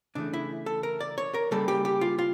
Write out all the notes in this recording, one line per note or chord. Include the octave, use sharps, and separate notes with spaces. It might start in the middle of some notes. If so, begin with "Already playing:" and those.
C#3 E3 A3 D4
E4
A4
A#4
D5
C#5
A#4
C#3 G3 A#3 A4
G4
G4
F4
F4